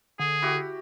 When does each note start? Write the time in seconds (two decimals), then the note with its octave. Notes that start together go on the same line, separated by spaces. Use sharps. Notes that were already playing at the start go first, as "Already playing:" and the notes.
0.19 D3 G#4
0.42 E4 F#4 G4